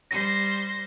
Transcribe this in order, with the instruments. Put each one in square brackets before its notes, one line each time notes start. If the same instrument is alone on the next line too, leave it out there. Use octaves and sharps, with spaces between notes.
[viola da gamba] G3 C5 [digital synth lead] A#6